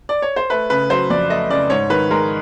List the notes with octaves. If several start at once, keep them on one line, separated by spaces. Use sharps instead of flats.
D5
C#5
C5
A3 B4
C#3 B4
F#3 C5
F2 D5
A3 D#5
C#3 D5
G#2 C#5
D#3 B4
G#3 A#4